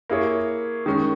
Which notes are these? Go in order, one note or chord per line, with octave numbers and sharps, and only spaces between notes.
A#3 E4 G#4 C#5
D#3 G#3 C#4